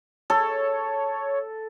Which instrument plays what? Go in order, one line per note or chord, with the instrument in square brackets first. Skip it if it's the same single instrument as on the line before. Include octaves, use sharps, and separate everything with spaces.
[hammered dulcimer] A4 [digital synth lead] C#5